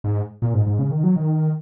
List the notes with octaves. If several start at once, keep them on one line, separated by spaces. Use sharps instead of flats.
G#2
A#2
G#2
G#2
C#3
D#3
F#3
D#3